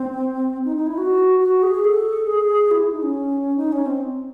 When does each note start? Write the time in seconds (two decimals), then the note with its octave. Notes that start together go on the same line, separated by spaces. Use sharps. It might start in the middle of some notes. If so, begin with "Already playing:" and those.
Already playing: C4
0.65 D#4
0.76 D#4
0.87 E4
0.98 F#4
1.40 F#4
1.63 G#4
1.84 A4
2.27 G#4
2.71 E4
2.92 D#4
3.02 C#4
3.56 D#4
3.72 C#4
3.86 C4